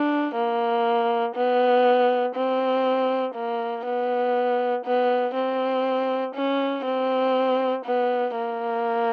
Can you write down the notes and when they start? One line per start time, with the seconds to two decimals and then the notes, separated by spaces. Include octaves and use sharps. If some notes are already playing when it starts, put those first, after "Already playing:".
Already playing: D4
0.35 A#3
1.35 B3
2.35 C4
3.35 A#3
3.85 B3
4.85 B3
5.35 C4
6.35 C#4
6.85 C4
7.85 B3
8.35 A#3